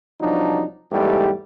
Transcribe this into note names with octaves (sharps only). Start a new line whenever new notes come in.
C2 F3 F#3 D4 D#4
E2 G#2 G3 A3 G4